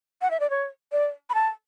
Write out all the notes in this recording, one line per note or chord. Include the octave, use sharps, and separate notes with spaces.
F#5
E5
D5
C#5
D5
B5
A5